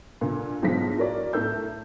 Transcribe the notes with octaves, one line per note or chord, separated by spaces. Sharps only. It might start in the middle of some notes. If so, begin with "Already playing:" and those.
A#2 D3
B1 G#2 D3 F3 A#6 B6
E4 F#4 A#4 C#5 D5
A2 A3 A#4 E6 G6